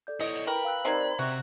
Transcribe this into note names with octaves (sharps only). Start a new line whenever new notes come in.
A4 D5 G6
B3 E4 C#5 D#5 D7
A#4 B4 G5 B5
F5 E6 F#6
D#3 G3 C4 C5 D5 A#5 G#6
C3 F#4 E5